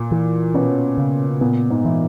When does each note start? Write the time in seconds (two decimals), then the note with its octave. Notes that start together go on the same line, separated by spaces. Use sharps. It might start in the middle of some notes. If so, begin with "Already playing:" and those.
Already playing: A#2
0.12 E3
0.54 B2 C#4
0.98 C#3
1.41 A#2 B3
1.70 G#2
1.85 E3